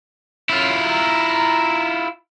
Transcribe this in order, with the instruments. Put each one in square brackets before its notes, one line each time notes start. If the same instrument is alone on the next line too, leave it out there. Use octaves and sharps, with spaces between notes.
[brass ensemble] F#2 C#4 [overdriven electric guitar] E4 F4
[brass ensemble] A#5